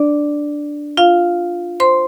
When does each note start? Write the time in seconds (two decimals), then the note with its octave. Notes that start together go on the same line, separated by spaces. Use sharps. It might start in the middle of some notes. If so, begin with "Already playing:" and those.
Already playing: D4 D5
0.97 F4 F5
1.80 C5 C6